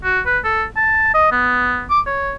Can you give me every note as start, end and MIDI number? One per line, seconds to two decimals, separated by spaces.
0.04 0.21 66
0.26 0.39 71
0.44 0.64 69
0.77 1.12 81
1.14 1.29 75
1.32 1.84 59
1.90 2.00 86
2.07 2.34 73